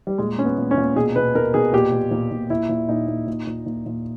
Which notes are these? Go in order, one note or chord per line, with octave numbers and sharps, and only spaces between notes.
G3
A#2 G#3
A#2 C#4
B3
A#2
C#4
A#2
B2 G#4
B2 B4
B2 A#4
B2 G#4
A#2 G4
A#2
A#2
A#2
A#2 E4
A#2
A#2 D#4
A#2
A#2
A#2
A#2
A#2